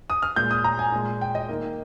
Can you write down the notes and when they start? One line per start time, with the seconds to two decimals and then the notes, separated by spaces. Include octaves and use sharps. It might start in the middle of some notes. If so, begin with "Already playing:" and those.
0.10 D#6
0.22 F6
0.36 A#2 G#3 G6
0.51 D#6
0.64 A#5
0.79 G#5
0.92 A#2 G#3
1.21 G5
1.35 D#5
1.49 D#3 A#3